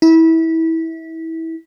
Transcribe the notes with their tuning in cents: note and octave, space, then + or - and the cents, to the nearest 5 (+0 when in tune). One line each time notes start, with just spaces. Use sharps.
E4 -25